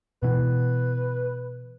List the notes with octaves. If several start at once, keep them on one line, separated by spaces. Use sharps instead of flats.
B2 E3 B4